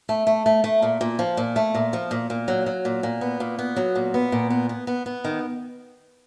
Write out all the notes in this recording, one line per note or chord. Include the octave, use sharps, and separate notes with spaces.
A3
A3
A3
A3
A#2
A#2
F3
A#2
A3
A#2
F3
A#2
A#2
F#3
F#3
A#2
A#2
B3
A#2
B3
F#3
A#2
B3
A#2
B3
B3
B3
B3
D#3